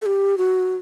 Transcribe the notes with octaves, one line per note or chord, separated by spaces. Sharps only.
A4
G4
F#4